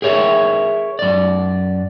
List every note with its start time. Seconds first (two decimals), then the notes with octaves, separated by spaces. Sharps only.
0.02 G#4 A#4 C#5 E5
0.99 F#2 D5